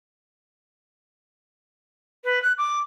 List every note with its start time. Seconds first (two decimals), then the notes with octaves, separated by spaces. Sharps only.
2.24 B4
2.42 F#6
2.58 D6